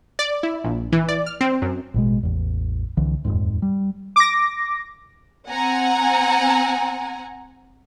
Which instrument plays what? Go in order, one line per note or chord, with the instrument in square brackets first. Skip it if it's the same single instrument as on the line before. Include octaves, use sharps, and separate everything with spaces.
[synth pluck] D5
E4
A#1
E3
D5
F6
C4
F#2
[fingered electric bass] A1 B2 G#3
A1 E2
C2 D3 E3
D#1 G#1 F2 G#2
G3
[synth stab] D6 A#6
[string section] C4 F#5 G#5 A#5